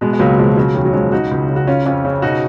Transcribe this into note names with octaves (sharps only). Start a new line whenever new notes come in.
B2 G#3 B3
G#3
C#2 F#3 A#3
B2 F3 G#3
C#3 F#3
D#2 F#3
F#3
C#3 F3 G#3
C#3 D#4 F#4
C#2
C#3
F#4
C#3 C#4 F4
F2 C#4 F4
C#3
B2 D#4 F#4